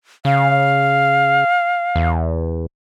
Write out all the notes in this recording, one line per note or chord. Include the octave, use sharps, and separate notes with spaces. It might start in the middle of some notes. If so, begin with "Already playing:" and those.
C#3 F5
E2